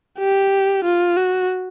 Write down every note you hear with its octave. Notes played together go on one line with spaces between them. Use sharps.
G4
F4
F#4